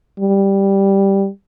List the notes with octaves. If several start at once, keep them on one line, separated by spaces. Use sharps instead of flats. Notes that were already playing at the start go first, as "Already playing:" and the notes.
G3